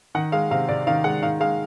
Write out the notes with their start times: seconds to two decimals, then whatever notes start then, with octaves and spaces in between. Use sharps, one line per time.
0.15 D#3 F#5
0.32 G#3 F5
0.51 C3 F5
0.69 C3 D5
0.87 D#3 F5
1.04 G#3 F#5
1.23 D#3 F5
1.40 G#3 F5